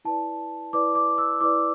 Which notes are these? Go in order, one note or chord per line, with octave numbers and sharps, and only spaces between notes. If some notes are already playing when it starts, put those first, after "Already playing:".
E4 B4 D5 A5
E4 B4 D5 D6
D6
E6
E4 B4 D5 D6